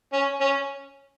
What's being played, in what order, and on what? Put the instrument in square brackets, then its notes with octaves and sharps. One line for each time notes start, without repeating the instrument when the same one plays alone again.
[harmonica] C#4
C#4